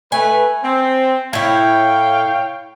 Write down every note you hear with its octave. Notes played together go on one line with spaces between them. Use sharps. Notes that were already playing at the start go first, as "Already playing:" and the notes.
A3 B4 G#5
C4
A2 E4 C#5 F5 G5